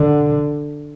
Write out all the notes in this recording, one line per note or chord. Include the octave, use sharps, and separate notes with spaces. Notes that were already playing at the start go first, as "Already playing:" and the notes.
Already playing: D3